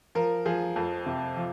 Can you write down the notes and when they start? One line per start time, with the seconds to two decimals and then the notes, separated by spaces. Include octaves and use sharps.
0.15 F3 A#4
0.46 F3 G#4
0.76 F2
1.06 C3
1.36 F3